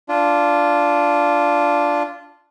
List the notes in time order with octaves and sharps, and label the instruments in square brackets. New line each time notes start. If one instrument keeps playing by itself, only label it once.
[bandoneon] D4 F4